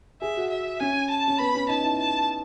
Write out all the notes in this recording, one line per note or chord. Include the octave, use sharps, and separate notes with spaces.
G#4 E5
F#4
E5
C#4 G#5
A5
C#4
B3 B5
C#4
D#4 A5
E4
A5